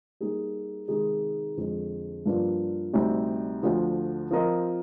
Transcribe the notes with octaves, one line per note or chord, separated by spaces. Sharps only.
G3 A#3 D#4 G#4
C3 D#3 G#3 D#4 G#4
F2 D3 G#3
G2 F3 A#3 D4 F4
D2 C3 G3 C4 D#4
D2 D3 F3
F3 C4 F4 A#4 D#5